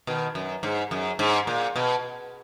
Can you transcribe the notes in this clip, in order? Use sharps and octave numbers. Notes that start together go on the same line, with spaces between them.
B2 D#3
F#2
G#2
F#2
G#2
A#2
B2